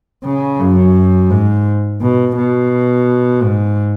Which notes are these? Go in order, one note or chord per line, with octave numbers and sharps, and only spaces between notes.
C#3
F#2
G#2
B2
B2
G#2